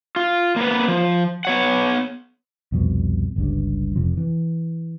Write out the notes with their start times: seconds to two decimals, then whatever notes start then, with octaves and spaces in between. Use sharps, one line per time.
0.16 F4
0.56 A#3 B3 B4
0.88 F3
1.45 B3 C#5 F#5
2.72 C2 F2 B2
3.36 G1 C#2 G2
3.96 F1 C3 F3
4.17 E3